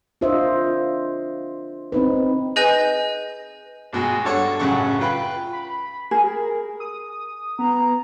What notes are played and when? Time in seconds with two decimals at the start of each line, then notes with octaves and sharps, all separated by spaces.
0.21 D4 F4 A#4 C5 D#5 E5
1.92 C4 D#4 B4
2.56 G#4 B4 D#5 G#5 G6
3.93 G#1 B2 G#3 G#4
4.25 G2 A4 C#5 F#5
4.59 A1 F#2 C#3 F#3 F#5 C#6
5.00 F4 B4 G5 B5
5.53 B5
6.11 G#4 A#4
6.80 D#6
7.59 B3 A#5